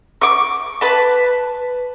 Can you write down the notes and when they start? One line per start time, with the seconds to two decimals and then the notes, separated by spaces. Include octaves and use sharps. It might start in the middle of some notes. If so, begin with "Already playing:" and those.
0.22 C#6 D6
0.81 B4 A5